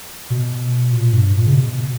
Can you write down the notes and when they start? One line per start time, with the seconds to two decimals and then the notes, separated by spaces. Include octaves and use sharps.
0.30 B2
0.92 A#2
1.13 G2
1.34 A#2
1.46 C#3
1.54 B2